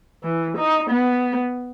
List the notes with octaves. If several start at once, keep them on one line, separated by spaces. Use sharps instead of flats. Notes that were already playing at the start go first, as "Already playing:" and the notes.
E3
D#4
B3